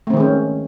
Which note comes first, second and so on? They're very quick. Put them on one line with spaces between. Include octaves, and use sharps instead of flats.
A3 C4 D#3 G#3 C#4